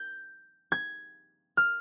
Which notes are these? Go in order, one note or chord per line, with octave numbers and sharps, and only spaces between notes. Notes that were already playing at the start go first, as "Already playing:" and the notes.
Already playing: G6
G#6
F6